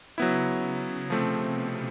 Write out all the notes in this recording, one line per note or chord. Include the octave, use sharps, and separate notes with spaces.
C#3 F#3 B3 E4
C#3
C3 F3 A3 C4
B2